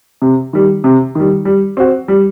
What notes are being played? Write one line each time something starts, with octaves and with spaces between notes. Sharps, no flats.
C3
D#3 G3
C3
D#3 G3
G3
C4 F#4
G3